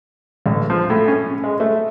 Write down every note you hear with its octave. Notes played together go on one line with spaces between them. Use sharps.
A1
F3
A2
C#4
G#3
A3